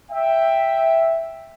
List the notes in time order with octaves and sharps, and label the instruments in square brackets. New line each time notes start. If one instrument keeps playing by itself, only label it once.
[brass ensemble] E5 G5